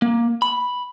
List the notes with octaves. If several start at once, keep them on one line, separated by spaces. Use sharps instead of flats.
A#3
B5